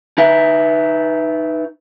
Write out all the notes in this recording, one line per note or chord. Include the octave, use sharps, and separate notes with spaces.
D#4 B4 E5